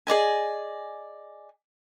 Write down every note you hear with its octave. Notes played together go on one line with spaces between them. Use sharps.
G#4 D5 D#5 G#5